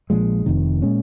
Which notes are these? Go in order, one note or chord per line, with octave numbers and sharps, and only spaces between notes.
A#1 A#2 F3 G#3
F1 F2 C3 D#3
A#2 G#3 C#4